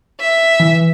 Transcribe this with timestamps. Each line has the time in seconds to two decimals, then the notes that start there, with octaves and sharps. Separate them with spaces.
0.20 E5
0.60 E3